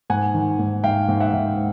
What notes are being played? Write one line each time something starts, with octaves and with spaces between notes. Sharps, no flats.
G#2 F#5 G#5
D#3
G#2
G#2 F5 G5
G#2
E5 F#5
G#2